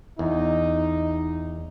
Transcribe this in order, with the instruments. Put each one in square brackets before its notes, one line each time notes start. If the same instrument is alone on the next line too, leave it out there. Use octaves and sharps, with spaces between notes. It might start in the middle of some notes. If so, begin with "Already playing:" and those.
[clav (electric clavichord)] E2 [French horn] D#4